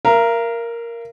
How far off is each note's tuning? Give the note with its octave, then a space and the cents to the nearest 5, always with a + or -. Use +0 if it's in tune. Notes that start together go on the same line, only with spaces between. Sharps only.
A#4 +0 F5 -45